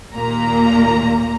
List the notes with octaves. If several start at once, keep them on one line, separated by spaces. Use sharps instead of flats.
D#2 A#2 A#3 A#5